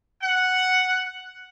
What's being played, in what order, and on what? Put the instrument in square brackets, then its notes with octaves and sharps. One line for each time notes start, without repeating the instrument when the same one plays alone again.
[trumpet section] F#5